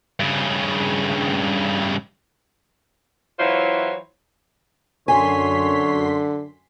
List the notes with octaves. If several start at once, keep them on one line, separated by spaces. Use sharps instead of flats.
G2 C#3
E3 F#3 E4 F4 C5 C#5
F#2 D3 C#5 G#5 C6 B6